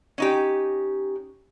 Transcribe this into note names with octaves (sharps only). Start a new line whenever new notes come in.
C#4 D#4 G4